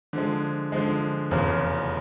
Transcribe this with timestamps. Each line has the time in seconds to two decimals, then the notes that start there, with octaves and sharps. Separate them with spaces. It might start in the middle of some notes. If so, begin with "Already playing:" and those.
0.13 D3 F3 G#3
0.72 D3 F3 G#3
1.31 F1 E2 C#3 F3